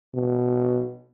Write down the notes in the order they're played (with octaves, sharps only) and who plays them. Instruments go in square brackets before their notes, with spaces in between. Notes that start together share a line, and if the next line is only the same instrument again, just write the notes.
[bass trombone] B2